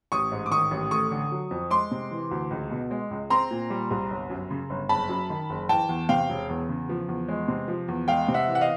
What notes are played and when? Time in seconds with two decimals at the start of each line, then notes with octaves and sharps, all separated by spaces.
0.12 A1 C#6 D#6
0.32 G#2
0.46 D6
0.51 D#3 C#6 D#6
0.71 A1
0.91 A3 C#6 D#6
1.11 D3
1.32 F#3
1.51 F2
1.71 G#3 C6 D6
1.91 C3
2.11 E3
2.31 D2
2.51 C#2
2.71 B2
2.91 G#3
3.11 C#2
3.30 C4 A#5 C6
3.51 A#2
3.70 G3
3.90 C2
4.10 G1
4.30 F#2
4.50 C#3
4.70 G1
4.89 F#1 A5 B5
5.09 F#2
5.30 D#3
5.50 F#1
5.69 E3 G5 A5
5.89 E2
6.09 C3 F5 G5
6.29 E1
6.49 E2
6.69 C#3
6.89 F3
7.08 E2
7.28 G#3
7.48 C3
7.68 F3
7.88 E2
8.08 G#3 F5 G5
8.28 C3
8.34 E5 F#5
8.48 E3
8.55 F#5
8.61 D#5 F5